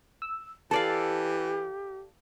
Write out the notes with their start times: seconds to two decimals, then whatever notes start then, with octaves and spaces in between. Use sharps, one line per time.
0.22 E6
0.71 E3 G4 A4 D5 F5 A5